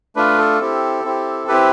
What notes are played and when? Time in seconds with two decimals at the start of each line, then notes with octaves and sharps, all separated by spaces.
0.16 A3 D4 F4 B4
0.38 A4
0.60 C4 E4 G4
1.04 C4 E4 G4
1.48 C4 E4 G4 B4